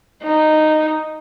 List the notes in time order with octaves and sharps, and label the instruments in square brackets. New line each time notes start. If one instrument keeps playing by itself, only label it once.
[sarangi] D#4